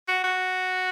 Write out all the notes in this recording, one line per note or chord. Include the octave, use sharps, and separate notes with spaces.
F#4
F#4